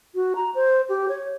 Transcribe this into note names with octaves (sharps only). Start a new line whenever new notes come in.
F#4
A#5
C5
G4
C#5